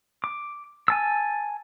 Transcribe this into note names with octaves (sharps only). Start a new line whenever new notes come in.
D6
G#5 A5 E6